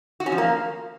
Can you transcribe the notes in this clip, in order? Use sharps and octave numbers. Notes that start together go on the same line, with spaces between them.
F#4
C#4
F3
A#3